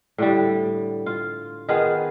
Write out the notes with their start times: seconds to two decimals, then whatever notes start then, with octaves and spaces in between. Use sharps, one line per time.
0.18 A2 D3 G3
1.06 F4
1.68 D#3 B3 F4 G#4